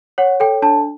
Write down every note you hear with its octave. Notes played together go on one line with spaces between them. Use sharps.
C#5 F#5
A4 G5
D4 A5